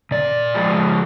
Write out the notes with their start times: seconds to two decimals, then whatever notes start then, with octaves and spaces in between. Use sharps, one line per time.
0.11 A#2 D5
0.54 F3 G#3